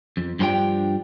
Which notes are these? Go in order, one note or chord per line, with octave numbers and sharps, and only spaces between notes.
F2
G2 F3 C4 D4 G4 G5